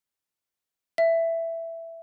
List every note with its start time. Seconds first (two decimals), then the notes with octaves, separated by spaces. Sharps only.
0.98 E5